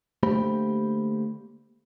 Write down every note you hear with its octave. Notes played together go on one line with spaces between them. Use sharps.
D3 A3 A#3 G4 C5 B5